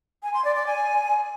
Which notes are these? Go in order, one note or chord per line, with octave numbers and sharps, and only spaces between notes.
G#5
C6
D5
D5
G#5